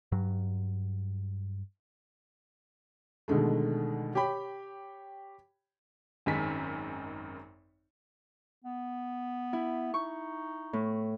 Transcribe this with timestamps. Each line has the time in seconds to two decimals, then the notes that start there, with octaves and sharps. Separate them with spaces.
0.12 G2 F#3
3.28 B2 D3 D#3 G#3 A3
4.15 G4 C#5 G5 B5
6.26 G#1 F#2 D#3 G#3 G#5 B6
8.64 B3
9.53 E4
9.94 D#4 C#6
10.73 A2